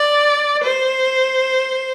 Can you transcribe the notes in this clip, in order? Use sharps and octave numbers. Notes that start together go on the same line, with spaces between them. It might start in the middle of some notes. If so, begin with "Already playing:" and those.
Already playing: D5
C5